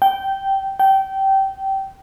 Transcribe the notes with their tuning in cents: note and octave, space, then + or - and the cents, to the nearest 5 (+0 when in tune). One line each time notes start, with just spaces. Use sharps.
G5 -10
G5 -20